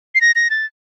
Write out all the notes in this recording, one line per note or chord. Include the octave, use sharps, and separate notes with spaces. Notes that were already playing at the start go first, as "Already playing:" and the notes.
C7
A#6
A#6
A6